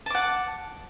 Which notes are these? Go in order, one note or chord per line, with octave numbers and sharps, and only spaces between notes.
F#5 A5 D6